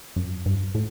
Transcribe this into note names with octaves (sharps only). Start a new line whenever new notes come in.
F#2
G2
A2